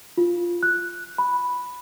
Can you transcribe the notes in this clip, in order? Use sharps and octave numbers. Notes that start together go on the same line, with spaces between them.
F4
F#6
B5